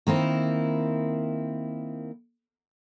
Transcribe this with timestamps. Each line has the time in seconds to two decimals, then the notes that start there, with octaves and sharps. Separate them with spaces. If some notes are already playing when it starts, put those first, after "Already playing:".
0.07 D#3 A#3 C4 E4